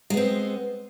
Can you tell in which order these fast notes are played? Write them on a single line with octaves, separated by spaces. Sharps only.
G#3 B3 C4